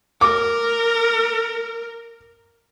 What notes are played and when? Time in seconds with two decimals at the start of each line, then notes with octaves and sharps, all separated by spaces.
0.21 A#4 D6